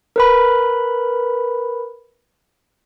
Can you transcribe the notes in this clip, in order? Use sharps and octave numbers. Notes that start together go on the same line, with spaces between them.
A#4 B4 B5